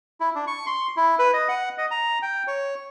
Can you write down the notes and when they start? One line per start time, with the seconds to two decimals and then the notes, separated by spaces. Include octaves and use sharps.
0.20 E4
0.35 D4
0.47 C#6
0.66 C6
0.97 E4
1.19 B4
1.33 D#5
1.48 F#5
1.78 D#5
1.91 A#5
2.22 G5
2.47 C#5